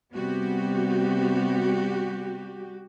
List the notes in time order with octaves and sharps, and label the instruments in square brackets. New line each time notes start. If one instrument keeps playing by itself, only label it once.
[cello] C3 B3 [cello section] G3 F#4 G4